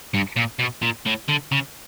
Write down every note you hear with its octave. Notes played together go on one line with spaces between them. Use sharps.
G2
A#2
B2
A#2
A2
D3
C#3